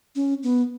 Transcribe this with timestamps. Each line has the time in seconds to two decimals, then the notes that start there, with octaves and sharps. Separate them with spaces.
0.15 C#4
0.43 B3